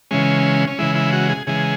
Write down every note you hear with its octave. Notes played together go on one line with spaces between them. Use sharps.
C#3 E3 G#3 C#4
C#4
C#3 E3 G#3 E4
E4
F#4
G#4
C#3 E3 G#3 G#4